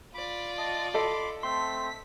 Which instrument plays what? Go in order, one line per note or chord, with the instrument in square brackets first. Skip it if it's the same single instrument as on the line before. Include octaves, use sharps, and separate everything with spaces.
[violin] F4 D5 [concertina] B5
[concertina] D#5 A5
[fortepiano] A4 D#5 [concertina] B5 C6 D6
[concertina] A3 C4 [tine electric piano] C6 [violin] B6